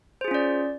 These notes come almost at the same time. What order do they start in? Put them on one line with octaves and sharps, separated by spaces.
C5 G#4 F4 C#4 D5